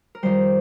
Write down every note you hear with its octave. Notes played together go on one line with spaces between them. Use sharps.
A#4
F2 D#3 G3 C5